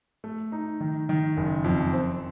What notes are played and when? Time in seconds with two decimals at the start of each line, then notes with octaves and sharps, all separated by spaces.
0.24 A3
0.52 D#4
0.80 D#3
1.09 D#3
1.37 F#1
1.64 F2
1.93 C4